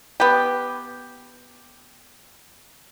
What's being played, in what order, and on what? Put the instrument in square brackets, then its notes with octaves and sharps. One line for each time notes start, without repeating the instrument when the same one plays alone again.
[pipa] B3 G4